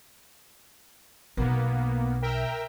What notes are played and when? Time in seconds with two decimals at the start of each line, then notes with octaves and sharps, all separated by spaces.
1.37 B1 A#3 B3
2.22 A#4 E5 G5